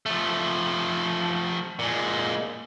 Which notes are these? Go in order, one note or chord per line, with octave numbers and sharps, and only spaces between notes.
F3 A3
A#2 G#3